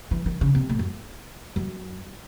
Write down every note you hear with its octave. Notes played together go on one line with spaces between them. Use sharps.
E3
D#3
C#3
C3
A2
F#2
F#2